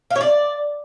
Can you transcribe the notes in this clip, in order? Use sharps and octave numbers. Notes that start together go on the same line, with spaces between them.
F5
C#5
D5